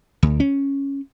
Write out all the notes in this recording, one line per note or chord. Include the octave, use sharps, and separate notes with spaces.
D2
C#4